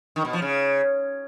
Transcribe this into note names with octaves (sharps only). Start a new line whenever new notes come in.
D#3
B2
F3
C#3